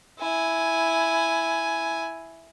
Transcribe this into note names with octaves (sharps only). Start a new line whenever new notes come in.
E4 G#5